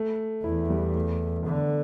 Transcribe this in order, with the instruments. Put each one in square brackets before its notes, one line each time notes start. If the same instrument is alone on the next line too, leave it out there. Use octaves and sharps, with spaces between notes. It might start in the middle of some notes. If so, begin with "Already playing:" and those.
Already playing: [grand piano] A3
[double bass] E2 [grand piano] E4
[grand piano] G3
A3
[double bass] D3 [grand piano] B3